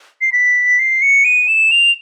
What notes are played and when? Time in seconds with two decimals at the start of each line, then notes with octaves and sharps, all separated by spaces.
0.21 C7
0.33 B6
0.79 C7
1.02 C#7
1.24 D#7
1.48 E7
1.71 F7